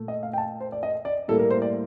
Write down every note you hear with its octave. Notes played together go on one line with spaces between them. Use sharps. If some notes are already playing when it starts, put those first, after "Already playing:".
Already playing: A#2 A3
D#5
F5
G5
A5
C5
D5
D#5
D5
A2 G3 A#3 A4
A#4
C5
D5